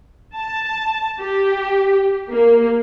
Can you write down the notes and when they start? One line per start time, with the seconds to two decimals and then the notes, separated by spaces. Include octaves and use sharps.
0.33 A5
1.20 G4
2.29 A#3